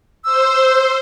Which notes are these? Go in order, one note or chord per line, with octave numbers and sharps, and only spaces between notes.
C5 E6